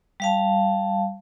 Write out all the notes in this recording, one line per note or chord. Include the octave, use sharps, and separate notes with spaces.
G3 F5 A5